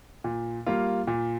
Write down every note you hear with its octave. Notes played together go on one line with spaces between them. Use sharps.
A#2
G3 A#3 F4
A#2